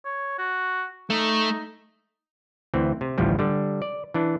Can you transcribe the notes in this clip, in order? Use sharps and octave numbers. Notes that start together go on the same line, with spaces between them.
C#5
F#4
A3 D#4
D2 E3 C4
C3
A1 D2 A2 F3 G3
D3 G3
D5
E3 D4